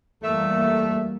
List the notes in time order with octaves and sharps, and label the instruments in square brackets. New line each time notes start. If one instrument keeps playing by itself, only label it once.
[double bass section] E2 G3 A#3 [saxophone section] A3 E5